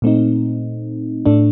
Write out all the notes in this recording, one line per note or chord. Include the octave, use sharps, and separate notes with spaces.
A#2 A3 C4 D#4
A2 A3 D4